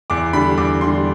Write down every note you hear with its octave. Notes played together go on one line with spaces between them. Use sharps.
E2 D6
D3 G3 B5
E2 D6
D3 G3 C6